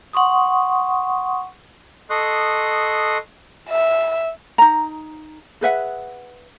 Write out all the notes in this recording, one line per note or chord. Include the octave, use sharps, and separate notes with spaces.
F#5 C6 C#6 D#6
A4 D#5 C6 C#6 D#6 F#6
E5
D#4 A#5
G#4 B4 E5 F#5